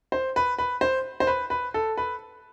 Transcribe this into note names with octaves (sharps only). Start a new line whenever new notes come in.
C5
B4
B4
C5
C5
B4
B4
A4
B4